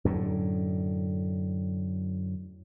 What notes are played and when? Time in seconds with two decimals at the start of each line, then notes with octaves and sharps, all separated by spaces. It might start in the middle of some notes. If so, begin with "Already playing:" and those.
0.05 F#2 A2 D3